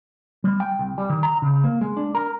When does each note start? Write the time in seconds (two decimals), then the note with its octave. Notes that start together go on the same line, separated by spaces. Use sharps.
0.44 G3
0.60 G5
0.79 C2
0.98 G3
1.10 D#3
1.23 A#5
1.42 C#3
1.64 A#3
1.81 G#3
1.97 D4
2.15 A#4